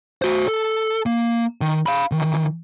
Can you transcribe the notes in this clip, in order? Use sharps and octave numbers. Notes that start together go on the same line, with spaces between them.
F#4 C5
A4
A#3
D#3
F5 B5
D#3 E3